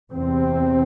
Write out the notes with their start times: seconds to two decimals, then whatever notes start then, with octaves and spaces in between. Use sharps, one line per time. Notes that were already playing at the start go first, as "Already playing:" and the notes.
0.13 E2 C3 C4